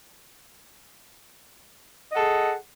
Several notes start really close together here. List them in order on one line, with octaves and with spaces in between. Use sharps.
D#5 F#5 A4 G#4